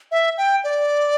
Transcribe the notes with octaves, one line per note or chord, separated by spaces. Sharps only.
E5
G5
D5